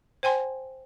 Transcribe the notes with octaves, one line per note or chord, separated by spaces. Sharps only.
C5 G5 G#5 C6